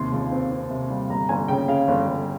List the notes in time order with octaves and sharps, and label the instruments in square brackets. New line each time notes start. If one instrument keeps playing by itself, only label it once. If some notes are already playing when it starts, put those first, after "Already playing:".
Already playing: [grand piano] D#2 C3 C6
C#2
C4
C4
C3
G3
G1 A#5
G1 G#5
C#3 G5
C#3 F5
G1
G1